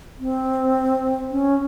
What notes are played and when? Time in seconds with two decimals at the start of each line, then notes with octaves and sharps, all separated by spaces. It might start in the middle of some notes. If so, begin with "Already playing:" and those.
0.19 C4
1.31 C#4